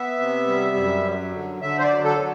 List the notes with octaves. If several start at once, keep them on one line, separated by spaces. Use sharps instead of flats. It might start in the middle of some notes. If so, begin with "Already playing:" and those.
Already playing: B3 E5
C3
G3
F#2
F#3
D3
D3 E5
C5
D5
F#3
A4
F#3